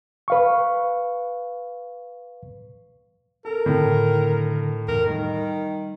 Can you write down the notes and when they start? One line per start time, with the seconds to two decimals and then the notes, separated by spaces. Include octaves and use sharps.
0.28 B4 F5 C#6
3.45 A4 A#4
3.66 A2 D3 D#3
4.88 F2 E3 A#4
5.06 D#3 G3 A3